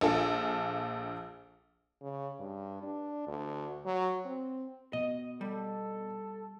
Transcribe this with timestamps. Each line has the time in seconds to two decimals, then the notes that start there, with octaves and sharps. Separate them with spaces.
0.01 A#1 D4 F4 A4 G#5 A5
2.02 C#3
2.39 G2
2.83 D4
3.27 D2
3.85 F#3
4.25 C4
4.93 B2 D#5
5.41 G3 A4